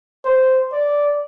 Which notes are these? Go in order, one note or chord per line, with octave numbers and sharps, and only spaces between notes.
C5
D5